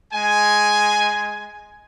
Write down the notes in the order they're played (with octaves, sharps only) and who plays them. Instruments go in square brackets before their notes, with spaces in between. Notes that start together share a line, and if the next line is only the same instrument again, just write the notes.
[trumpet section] G#3 G#5